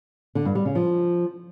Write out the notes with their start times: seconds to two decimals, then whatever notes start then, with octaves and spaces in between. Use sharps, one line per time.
0.35 D3
0.45 G2
0.55 G3
0.65 C#3
0.75 F3